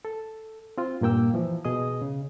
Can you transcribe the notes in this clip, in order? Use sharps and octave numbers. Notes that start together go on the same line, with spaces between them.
A4
C4 F4
G2 A#2 A#3 G5 E6
E3 F3
B2 G#4 D#5 D#6
C#3